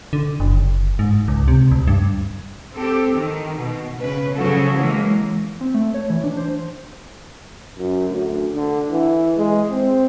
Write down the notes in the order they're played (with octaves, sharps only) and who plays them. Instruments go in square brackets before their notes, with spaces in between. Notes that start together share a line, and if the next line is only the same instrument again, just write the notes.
[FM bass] D3
F#1
G#2
C#2
C3
D2
G2
[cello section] C4 G4 A4
D#3
B2
C#3 B4
C#3 F3 F#3 F#4 A4
E3 F#3 G#3 A#3
[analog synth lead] C4
A3
C#5
E3
D4
C5
[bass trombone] F#2
D2
D3
E3
G#3
C4